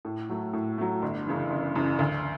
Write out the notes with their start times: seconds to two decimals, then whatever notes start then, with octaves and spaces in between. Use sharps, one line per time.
0.05 A2
0.30 F#3 A3
0.53 A2
0.78 F#3 A3
1.02 G1
1.27 F#2 C#3 E3
1.50 G1
1.75 F#2 C#3 E3
1.99 D2